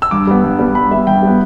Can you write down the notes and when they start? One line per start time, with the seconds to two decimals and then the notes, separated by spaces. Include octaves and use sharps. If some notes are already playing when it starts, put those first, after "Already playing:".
0.02 E6
0.11 G2 D6
0.27 G3 B3
0.44 G2
0.59 G3 B3
0.75 G2 B5
0.91 G3 B3 E5
1.07 G2 G5
1.22 G3 B3